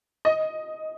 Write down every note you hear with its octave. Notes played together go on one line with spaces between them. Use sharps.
D#5